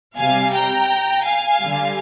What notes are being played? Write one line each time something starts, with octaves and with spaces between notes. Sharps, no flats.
C3 G3 F5 G#5
G5 A#5
F5 G#5
D3 G3